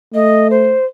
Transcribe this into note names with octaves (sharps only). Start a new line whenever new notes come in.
A3 D#5
C5